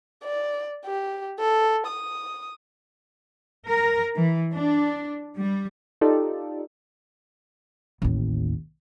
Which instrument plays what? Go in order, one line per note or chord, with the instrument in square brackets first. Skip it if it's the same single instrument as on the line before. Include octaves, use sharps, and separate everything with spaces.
[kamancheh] D5
G4
A4
D#6
[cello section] A#4
E3
D4
G3
[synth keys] D#4 F4 G4 A4 D5
[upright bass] A1 D#2